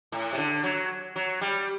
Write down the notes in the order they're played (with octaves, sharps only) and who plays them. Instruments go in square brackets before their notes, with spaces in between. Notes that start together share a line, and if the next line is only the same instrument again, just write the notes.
[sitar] A2
C3
D3
F#3
F#3
G3